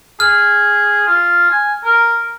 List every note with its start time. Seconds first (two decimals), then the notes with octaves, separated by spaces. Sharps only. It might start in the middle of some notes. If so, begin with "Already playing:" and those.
0.20 G#4 F6
1.07 F4
1.51 G#5
1.85 A#4